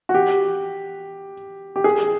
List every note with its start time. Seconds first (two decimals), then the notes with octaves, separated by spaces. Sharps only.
0.09 F#4
0.14 G4
1.76 G4
1.84 G#4